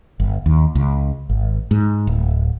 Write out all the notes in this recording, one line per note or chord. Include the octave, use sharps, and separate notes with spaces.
G1
D#2
C#2
G#1
G#2
D1